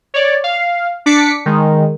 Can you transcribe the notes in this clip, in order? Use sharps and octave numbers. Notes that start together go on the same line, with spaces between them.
C#5 D5
F5
D4 D6 B6 C#7
D#3 G#3